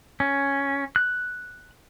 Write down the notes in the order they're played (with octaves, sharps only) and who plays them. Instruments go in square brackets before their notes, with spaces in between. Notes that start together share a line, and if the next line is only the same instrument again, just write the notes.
[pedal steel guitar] C#4
F#6